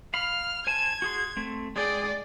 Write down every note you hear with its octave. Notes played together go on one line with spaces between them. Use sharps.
F5 B5 F6
C5 G#5 A5 G#6
F#4 G#4 C6
A3 C4
G#3 G#4 D5 G5